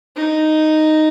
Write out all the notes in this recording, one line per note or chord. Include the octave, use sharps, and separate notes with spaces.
D#4